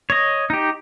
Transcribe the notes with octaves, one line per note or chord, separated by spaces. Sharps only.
C#5 D#5
D#4 G4